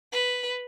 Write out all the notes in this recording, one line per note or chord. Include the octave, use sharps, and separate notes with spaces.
B4